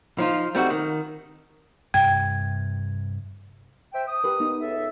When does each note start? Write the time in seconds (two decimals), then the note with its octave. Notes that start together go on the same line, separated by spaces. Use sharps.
0.18 F3 D#4 F4
0.55 G3 A3 C4 D#4 F#4
0.70 D#3
1.94 G2 C3 G5 G#6
3.94 C5 E5 G5
4.07 D#6
4.24 G4 A#4 B4
4.40 B3 D#4
4.61 C#2 A4 E5